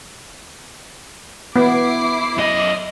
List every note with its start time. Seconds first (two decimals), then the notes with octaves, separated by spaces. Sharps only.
1.56 B3 E4 D6 C7
2.38 F#2 D#5